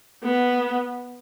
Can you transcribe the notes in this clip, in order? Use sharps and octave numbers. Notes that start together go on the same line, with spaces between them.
B3